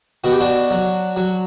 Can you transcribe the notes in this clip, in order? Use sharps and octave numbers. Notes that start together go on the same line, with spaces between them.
B2 F#4
G4
D4 F#4
F#3
F#3